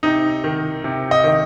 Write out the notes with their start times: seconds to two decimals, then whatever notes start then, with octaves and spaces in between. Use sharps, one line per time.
0.03 C3 D#4
0.44 D#3
0.84 C3
1.11 D#5
1.24 D#3